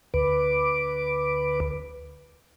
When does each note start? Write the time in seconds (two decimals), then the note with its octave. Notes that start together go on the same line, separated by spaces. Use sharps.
0.14 D2 B4 D6